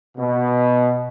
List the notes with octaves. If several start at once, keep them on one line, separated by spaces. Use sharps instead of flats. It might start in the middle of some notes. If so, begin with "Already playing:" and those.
B2